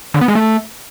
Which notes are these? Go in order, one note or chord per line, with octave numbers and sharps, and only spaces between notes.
D3
B3
G#3
A3